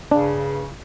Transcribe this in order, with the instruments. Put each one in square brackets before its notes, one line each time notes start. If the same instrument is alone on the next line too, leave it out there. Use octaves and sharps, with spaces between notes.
[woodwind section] G2 C#3 [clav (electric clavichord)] D4